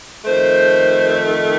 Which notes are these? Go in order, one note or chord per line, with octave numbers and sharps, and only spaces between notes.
F2 D#3 A3 C5
C5